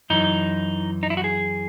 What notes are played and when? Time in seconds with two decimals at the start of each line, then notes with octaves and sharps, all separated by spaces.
0.10 F#2 E3 D#4
1.03 D#4
1.10 E4
1.17 F#4
1.24 G#4